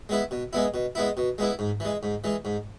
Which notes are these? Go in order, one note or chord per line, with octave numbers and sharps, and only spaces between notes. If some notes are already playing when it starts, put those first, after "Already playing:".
G#3 B3 E4
B2
G#3 B3 E4
B2
G#3 B3 E4
B2
G#3 B3 E4
G#2
E3 G#3
G#2
E3 G#3
G#2